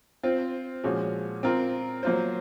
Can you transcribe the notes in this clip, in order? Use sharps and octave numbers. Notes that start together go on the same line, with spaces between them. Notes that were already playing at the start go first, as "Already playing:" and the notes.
C4 F4 C5
A#2 F3 G#3 C#4 F#4
C4 F4 A#4
F#3 A#3 F4 C5